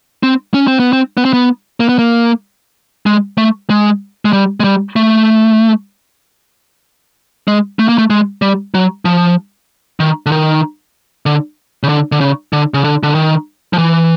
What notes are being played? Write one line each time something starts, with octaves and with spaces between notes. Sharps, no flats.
C4
C#4
C4
B3
C4
B3
C4
B3
A#3
B3
A#3
G#3
A3
G#3
G#3
G3
G#3
G3
A3
G#3
A3
A#3
A3
G#3
G3
F#3
F3
D#3
D3
D#3
D3
C#3
D3
D3
C#3
D3
C#3
D3
D3
D#3
F3
E3